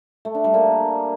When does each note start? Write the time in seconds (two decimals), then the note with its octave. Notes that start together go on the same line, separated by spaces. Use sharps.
0.25 A3
0.35 D4
0.44 G3
0.54 A#3